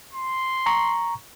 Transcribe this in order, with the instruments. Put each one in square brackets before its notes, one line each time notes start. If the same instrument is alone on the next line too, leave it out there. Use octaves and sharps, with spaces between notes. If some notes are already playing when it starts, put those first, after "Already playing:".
[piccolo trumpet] C6
[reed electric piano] A#5 C#6